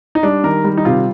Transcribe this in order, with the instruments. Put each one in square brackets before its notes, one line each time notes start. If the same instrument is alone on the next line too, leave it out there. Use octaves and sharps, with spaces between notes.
[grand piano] D#4
G3 D4
D#3 A#4
G3
D#4
C3 F4